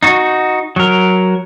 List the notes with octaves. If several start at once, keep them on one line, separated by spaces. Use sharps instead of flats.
D#4 F#4
F#3 A#4